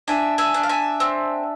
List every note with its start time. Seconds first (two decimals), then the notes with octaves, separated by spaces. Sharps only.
0.08 D4 E5 G#5
0.38 E5 G#5
0.54 D4
0.63 F5
0.69 E5 G#5
1.00 C4